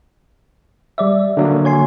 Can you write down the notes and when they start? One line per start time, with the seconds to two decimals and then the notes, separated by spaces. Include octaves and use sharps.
0.98 G3 D5 E5
1.37 D3 F#3 A#3
1.65 C#5 G#5 C6